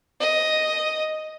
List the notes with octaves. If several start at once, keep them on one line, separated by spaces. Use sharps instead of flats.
D#5